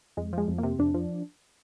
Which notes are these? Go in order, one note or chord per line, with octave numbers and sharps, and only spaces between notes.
F2 G#3
F3 G#3
F2
A#3
C3
F2 D4
F3